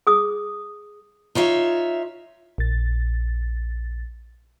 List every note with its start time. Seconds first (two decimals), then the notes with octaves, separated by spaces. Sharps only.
0.07 G#4 D#6
1.35 D#4 F4 C#5 E5
2.58 A#1 A6